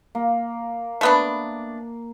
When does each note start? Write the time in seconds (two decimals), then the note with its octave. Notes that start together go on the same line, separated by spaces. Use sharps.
0.15 A#3
1.01 A3 B3 D4